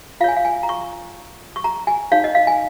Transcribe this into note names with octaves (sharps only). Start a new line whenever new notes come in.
F4 C#5 F5 G#5
F5
G#5
A#5
C#6
C#6
A#5
G#5
D#4 C#5 F5
D#5
F5
G#5